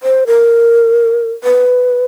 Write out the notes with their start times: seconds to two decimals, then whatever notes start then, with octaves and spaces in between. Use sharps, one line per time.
0.03 C5
0.27 A#4
1.44 B4